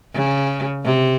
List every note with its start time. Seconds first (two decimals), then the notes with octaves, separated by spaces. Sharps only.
0.13 C#3
0.84 C3